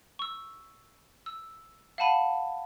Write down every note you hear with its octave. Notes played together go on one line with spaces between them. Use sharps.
C#6 E6
E6
F5 F#5 A5 B5 D#7